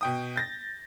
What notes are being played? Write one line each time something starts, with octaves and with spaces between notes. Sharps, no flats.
B2 G5 D#6
G6 A6 A#6